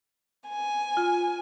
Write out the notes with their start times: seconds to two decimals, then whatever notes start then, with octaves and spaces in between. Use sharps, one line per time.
0.49 G#5
0.97 F4